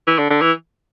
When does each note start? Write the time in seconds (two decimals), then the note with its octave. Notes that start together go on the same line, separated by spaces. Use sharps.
0.07 E3
0.18 D3
0.30 D3
0.41 E3